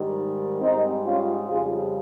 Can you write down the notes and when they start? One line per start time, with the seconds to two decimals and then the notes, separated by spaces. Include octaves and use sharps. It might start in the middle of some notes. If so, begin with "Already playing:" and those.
Already playing: G#2 D#3 G3
0.61 G#2 G3 C4 D#4
1.04 C#4 F4
1.47 F2 C#3 G3 F4 G#4